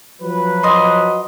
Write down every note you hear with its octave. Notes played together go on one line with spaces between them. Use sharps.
F3 F#3 B4
D#5 C6